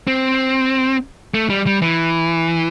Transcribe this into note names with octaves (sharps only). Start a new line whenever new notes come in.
C4
A3
G3
G3
E3